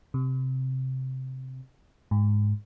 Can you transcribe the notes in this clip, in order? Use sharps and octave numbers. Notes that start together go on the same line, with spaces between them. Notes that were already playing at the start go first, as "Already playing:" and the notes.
C3
G#2